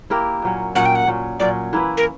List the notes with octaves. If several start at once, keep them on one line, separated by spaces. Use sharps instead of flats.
A#3 E4 G4 A#4
A#2 F#3 C#4
A#2 F#3 C#4 F#5
G5
F#5
A#2 F#3 C#4
A#2 F#3 C#4 D5
E3 A#3 E4 B4
A#4